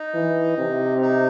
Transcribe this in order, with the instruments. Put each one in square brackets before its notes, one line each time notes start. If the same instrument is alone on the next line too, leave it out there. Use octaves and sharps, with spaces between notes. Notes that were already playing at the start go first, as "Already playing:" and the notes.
Already playing: [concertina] D#4
[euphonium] E3
C3
[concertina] D#4